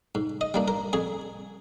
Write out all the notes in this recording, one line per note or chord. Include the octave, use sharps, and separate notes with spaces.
G#2
D#5
G3 A#3 D4
A#4
F2 G#4